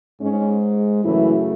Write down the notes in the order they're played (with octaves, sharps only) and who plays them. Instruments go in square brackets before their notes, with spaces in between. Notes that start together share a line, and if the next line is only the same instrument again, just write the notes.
[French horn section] G#2 G#3 C#4
F#2 C#3 E3 F#3 A3 E4